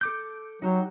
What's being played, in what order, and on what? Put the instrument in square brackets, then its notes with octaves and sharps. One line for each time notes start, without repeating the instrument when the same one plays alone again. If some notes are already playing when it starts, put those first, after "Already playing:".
[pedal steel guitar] A4 D6 G6
[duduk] F#3 [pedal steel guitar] D#4 F#4 G4